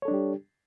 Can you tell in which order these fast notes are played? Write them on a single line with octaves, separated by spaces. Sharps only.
C#5 A4 D4 G3 G4